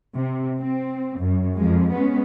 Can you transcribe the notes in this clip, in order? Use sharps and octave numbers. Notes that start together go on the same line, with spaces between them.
C3
C4
F#2
F2 F3 G#3
G#3 B3 C#4